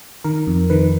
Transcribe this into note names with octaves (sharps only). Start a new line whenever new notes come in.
D#3 A#4
F2
D#3 B4